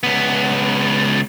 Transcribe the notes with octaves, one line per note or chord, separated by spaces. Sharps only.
C#2 B3